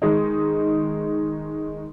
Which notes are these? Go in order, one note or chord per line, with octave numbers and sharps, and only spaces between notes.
D#3 G#3 D#4